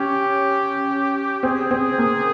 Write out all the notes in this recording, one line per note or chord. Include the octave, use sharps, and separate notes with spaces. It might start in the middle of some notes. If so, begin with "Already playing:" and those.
Already playing: C#4 G4
C4 G#4
C4
A#3